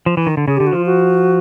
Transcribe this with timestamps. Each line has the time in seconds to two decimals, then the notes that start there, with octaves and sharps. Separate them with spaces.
0.06 F3
0.17 E3
0.27 D#3
0.37 D3
0.47 C#3 G#4
0.57 D3 G4
0.67 F#4
0.72 F3 F4
0.86 F#4